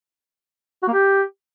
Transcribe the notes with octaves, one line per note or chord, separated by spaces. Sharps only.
F#4
A#3
G4